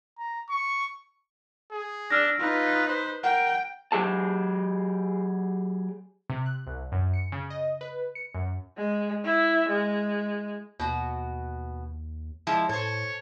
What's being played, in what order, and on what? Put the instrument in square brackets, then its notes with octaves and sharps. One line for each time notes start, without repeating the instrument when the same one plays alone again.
[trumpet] A#5
C#6
[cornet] G#4
[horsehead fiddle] D4 [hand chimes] E6 F6 A#6
[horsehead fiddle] D#4 B4 [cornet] F4
[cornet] C5
[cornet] A#4 [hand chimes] F#5 [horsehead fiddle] G5
[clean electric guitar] F#3 G4 G#4 A5
[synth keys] C3
F#6
C2
F#2
C#7
C#3
D#5
B4
C#7
F#2
[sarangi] G#3
E4
G#3
[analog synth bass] D#2 [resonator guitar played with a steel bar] B2 F#4
[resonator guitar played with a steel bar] F3 G#3 E4
[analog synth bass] A2 [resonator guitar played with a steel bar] A4 C5 [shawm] C#5